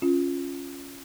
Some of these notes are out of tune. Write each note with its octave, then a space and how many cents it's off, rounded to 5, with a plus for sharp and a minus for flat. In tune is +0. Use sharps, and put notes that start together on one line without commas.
C#4 +0 F4 +0